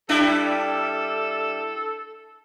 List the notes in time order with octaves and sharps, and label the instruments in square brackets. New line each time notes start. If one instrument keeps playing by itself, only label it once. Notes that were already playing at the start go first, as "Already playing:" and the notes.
[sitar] G3 D4 E4 [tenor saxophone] A4